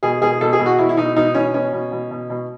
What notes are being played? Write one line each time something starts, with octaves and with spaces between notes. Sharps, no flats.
B2 G#4
B2 G#4
B2 A4
G#4
B2
F#4
B2 E4
E4
B2 D#4
B2 D#4
B2 C#4
B2 C#4
B2
B2
B2
B2